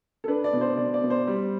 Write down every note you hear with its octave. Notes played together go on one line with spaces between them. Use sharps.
A4
D4 B4
D5
B2
C5
B2 D5
D5
B2
C5
G3